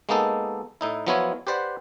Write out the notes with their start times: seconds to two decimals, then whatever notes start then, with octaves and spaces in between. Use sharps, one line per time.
0.09 G#3 A#3 B3 D#4 A4
0.81 A2 D#4 E4
1.07 F3 F#3 B3 E4 F4 C#5
1.47 G4 B4 C5 D5 F#5